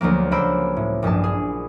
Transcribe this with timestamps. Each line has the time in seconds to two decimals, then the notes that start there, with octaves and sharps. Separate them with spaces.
0.01 D2 F3 F#3 A#3
0.31 C#2 A#3 C5 B5 E6 D7
0.77 A2
1.02 A#1 G2 G#4 A5
1.24 G#4